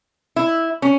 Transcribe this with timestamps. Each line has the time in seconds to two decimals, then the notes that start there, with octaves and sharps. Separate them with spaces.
0.36 E4
0.82 C#4